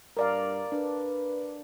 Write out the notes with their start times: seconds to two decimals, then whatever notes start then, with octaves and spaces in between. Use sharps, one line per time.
0.17 G2 A#4 D5 F5
0.72 D4 B4